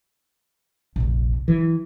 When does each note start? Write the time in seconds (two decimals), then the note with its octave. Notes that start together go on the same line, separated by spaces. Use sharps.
0.96 F1 A#1
1.48 E3 F#3